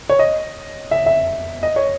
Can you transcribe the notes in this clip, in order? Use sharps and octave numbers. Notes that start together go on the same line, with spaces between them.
C#5
D#5
E5
E5
D#5
C#5